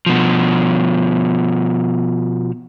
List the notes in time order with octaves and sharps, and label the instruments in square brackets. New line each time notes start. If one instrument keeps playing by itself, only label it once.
[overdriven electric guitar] B2 F3